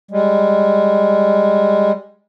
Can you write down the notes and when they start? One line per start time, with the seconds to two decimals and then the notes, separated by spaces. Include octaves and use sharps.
0.11 G3 G#3